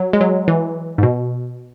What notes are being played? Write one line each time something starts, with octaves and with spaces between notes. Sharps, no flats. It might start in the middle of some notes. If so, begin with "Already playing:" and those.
Already playing: F#3
G#3
F#3
E3
G#2
B2